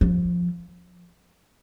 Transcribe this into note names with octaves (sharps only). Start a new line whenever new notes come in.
F3